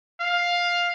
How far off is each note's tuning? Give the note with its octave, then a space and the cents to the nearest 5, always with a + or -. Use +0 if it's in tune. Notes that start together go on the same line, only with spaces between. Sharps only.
F5 +5